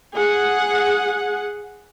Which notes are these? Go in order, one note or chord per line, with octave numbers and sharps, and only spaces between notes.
G#4 F#5